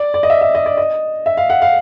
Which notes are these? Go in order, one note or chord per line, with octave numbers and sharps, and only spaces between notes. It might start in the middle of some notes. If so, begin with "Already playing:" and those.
Already playing: D5
D5
D#5
E5
E5
D#5
D5
D#5
E5
F5
F#5
F5